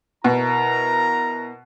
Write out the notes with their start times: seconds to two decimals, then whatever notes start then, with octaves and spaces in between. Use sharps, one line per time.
0.24 B2 E4 A#4 A#5